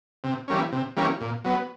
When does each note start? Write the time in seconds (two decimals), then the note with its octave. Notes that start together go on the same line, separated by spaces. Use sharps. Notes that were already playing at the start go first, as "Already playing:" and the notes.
0.24 C3
0.48 E3 G3 A#3 C#4
0.72 C3
0.97 E3 G3 A#3 C#4
1.21 A#2
1.44 F#3 B3